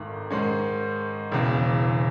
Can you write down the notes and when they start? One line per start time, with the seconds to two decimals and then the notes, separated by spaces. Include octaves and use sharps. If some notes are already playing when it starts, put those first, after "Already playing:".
Already playing: G#1 G#2 D#3 A3
0.31 G#2 D#3 G#3 C#4
1.32 E1 E2 C#3